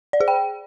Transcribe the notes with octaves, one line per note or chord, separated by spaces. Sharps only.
D5
G#4
G5